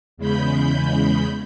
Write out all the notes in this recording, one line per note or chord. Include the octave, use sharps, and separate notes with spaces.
E2 C#3 G#3 B5 G6